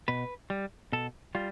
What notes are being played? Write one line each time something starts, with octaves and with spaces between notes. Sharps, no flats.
B2 B4
G3
B2 A4
G3 F4